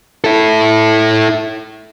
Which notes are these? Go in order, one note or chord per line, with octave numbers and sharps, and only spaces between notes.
E4 A4